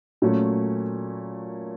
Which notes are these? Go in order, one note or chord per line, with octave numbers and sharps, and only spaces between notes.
A#2 F#3 A3 C#4